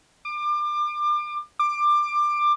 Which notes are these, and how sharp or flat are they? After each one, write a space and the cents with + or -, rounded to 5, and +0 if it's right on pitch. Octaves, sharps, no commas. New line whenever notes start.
D6 +30
D6 +20